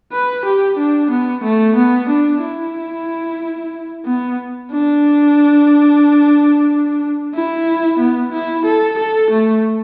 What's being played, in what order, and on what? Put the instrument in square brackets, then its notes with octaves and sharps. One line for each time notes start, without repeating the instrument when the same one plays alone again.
[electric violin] B4
G4
D4
B3
A3
B3
D4
E4
B3
D4
E4
B3
E4
A4
A4
A3